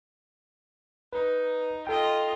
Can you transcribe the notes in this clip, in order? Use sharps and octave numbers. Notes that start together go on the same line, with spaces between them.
D#4 B4
F4 A4 D#5 G5